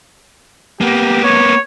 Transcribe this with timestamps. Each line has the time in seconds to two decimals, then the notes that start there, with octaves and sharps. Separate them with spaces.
0.81 A#3 B3 G4
1.24 C#5